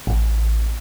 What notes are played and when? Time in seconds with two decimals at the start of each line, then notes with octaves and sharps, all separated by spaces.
0.07 A1